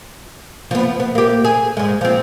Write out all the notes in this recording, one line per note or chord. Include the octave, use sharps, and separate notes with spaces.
F3 B3
B3
A#3 G4
G#4
G#2 G#3
F3 C4